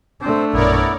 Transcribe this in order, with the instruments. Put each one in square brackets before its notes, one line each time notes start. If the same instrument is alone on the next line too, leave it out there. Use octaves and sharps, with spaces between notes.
[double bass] A3 D4 [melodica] C4 C5
[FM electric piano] A#1 F#2 B2 [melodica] B3 E4 [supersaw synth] A#4 C#5 D5